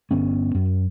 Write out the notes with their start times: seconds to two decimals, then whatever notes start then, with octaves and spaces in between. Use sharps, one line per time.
0.11 G1 B3 C#4
0.55 F#2